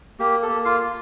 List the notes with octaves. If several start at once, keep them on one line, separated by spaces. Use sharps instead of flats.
A#3 G4
A4
A#3
F4 F5
F4